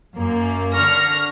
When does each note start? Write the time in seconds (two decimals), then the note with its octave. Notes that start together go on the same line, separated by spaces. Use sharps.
0.16 F#2 A#3
0.75 D3 C#6 F6 A#6